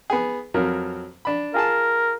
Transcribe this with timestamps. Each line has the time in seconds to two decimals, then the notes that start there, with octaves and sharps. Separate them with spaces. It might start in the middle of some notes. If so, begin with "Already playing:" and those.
0.10 B3 G#4
0.54 F2 F#3 A#4
1.25 D4 B5
1.54 F4 G#4 A#4 A5